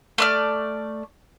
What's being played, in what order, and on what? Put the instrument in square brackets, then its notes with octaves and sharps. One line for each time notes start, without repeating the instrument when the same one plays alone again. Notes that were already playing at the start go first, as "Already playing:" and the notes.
[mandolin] A3 D5 F6